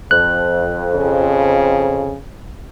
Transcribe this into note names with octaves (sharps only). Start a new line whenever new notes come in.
F2 F#6
C#3